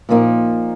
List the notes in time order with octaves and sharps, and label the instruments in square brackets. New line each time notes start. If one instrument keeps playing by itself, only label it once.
[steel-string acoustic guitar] A#2 F3 A#3 D#4